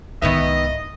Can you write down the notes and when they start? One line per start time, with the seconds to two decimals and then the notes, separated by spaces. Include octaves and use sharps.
0.22 C2 G#2 D#3 B3 D#5 E5